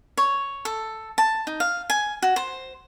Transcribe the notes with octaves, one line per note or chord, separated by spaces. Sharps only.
C#5
A4
A5
D#4
F5
G#5
F#4
C5